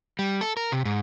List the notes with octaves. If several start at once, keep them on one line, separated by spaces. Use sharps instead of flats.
G3
A4
A#4
C3
G#2